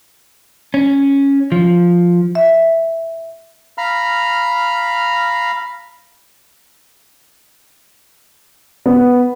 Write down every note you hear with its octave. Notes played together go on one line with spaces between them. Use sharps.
C#4
F3
E5
F5 A#5 B5 F6
B3